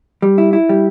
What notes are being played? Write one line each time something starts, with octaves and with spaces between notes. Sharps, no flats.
G3
E4
E4
G3